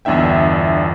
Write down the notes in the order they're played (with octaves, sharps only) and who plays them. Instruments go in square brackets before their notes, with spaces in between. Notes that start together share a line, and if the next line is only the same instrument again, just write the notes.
[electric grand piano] G1 E2 D4 E5 G5